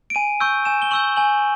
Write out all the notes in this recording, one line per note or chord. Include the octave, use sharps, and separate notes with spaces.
D7
G#5 D#7
C#6 E6 G6
G#5 E7
G7
C#6 E6 G6 F#7
G#5 F#7